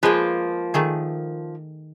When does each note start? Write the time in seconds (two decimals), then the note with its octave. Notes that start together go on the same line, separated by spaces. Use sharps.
0.03 F3 G#3 A#3 B4
0.74 D#3 A3 G#4